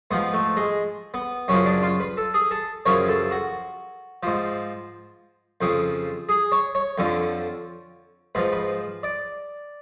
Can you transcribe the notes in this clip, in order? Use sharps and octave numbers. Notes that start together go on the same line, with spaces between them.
G#2 F3 B3
A3
G#3
B3
F#2 C#3 F3 C#4
D4
F4
B4
A4
G#4
A4
F#2 C#3 F3 C#5
A4
F#4
G#2 F3
F2 C#3 F3
G#4
C#5
C#5
F2 D3 F3
G#2 F3 B4
B4
D5